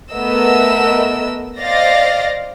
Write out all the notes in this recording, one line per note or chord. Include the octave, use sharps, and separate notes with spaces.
A3 B3 A#4 D#5 E6
C5 D5 D#5 F5 A6 A#6